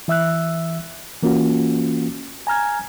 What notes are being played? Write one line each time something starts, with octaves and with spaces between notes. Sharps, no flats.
E3 E5 E6 F#6
E3 A#3 C#4 F4 F#4
G#5 A#5 F6 G#6